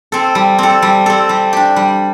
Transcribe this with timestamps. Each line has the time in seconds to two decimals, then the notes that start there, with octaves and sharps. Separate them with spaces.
0.12 C4 A4
0.35 G3
0.58 C4 A4
0.82 G3
1.06 C4 A4
1.29 G3
1.53 D4 G4
1.76 G3